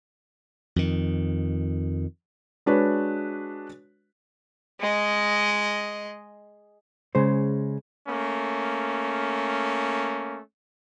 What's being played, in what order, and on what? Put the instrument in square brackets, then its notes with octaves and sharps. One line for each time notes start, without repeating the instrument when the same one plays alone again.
[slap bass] F2 D#3
[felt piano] G#3 D4 F#4 B4 C#5
[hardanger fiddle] G#3 D#5
[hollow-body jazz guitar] C#3 G#3 C5
[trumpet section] A3 A#3 C#4